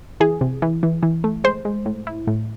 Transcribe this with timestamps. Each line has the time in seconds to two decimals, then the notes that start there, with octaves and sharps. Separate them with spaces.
0.20 E3 G#4
0.41 C3
0.62 E3
0.83 E3
1.03 E3
1.24 A3
1.44 G#3 C5
1.65 G#3
1.86 A2
2.07 E4
2.27 A2